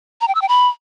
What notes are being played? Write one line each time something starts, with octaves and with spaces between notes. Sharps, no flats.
A#5
G5
E6
G5
B5